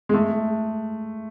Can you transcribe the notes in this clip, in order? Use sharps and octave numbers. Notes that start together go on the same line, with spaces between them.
G#3
A3